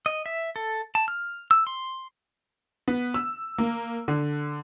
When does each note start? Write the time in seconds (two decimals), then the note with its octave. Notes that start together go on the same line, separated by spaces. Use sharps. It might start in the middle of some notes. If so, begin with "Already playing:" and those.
0.06 D#5
0.26 E5
0.56 A4
0.95 A5
1.08 F6
1.51 E6
1.67 C6
2.88 B3
3.14 E6
3.58 A#3
4.08 D3